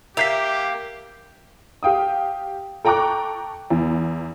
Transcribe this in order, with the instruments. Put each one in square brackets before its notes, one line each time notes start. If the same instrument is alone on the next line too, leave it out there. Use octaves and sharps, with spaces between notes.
[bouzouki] A#3 [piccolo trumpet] G4 [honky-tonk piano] E5 G6 [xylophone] B6 C7 F7
[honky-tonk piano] G4 F5 G5 D#6
A4 G5 A#5 C#6 D6 F#6
E2